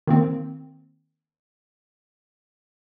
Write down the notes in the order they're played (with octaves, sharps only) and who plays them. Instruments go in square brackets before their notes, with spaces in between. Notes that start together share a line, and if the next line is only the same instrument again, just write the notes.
[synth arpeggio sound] D#3 A#3 C4